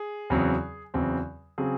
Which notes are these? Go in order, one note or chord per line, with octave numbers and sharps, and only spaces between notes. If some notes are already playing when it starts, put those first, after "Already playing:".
Already playing: G#4
E2 C#3 F#3 C4
E2 C#3 F#3 C4
C#3 F#3 C4 G#4